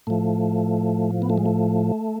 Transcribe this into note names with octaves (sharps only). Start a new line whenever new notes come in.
A2 F3 A3
B3
A3
G#3
A3